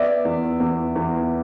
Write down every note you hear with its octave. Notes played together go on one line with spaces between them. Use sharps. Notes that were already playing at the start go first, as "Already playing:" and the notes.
Already playing: B3 D5 E5
E2
E2
E2